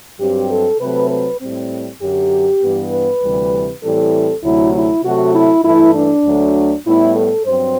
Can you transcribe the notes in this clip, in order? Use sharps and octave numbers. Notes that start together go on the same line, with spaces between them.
G2 F#3 C4 G4
A4
C3 F#3 A3 C4 B4
B4
A2 G3 C4
F#2 D3 F#3 G4
G2 E3 B3
B4
D2 C3 E3 G3
A2 E3 G3 C4 A4
D2 C3 F#3 A3 E4
E4
C3 F#3 A3 F#4
E4
G2 E3 A3 E4
D4
D2 D3 F#3 A3
A2 G3 B3 E4
A4
G2 F#3 C4 C5